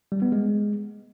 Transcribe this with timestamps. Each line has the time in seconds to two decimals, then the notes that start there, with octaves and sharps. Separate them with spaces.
0.12 G3
0.22 B3
0.32 G#3